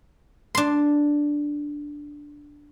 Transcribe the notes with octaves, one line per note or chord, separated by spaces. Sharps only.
D4 C6